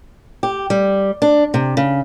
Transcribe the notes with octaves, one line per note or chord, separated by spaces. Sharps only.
G4
G3
D4
C3
C#3